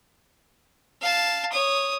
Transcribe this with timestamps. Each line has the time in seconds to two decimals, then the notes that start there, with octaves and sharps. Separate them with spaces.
1.01 F5 A5
1.52 C#5 D#6